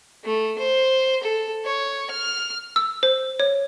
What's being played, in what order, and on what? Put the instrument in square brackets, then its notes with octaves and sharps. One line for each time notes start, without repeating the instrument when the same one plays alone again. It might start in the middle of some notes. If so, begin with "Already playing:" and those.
[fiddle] A3
C5
A4
C#5
F6
[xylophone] E6
C5
C#5